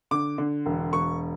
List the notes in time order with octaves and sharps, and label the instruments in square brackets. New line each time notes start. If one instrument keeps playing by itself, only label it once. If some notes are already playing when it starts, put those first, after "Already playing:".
[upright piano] D3 D6
D3
E1
E1 C#6